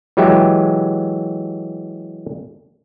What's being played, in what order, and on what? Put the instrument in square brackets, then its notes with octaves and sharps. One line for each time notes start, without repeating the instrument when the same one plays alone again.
[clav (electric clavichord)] E3 F#3 G#3 G4 E5